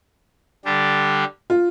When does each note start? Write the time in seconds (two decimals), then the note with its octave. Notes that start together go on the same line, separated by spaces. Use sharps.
0.65 D3 G3 D4 G4
1.50 F4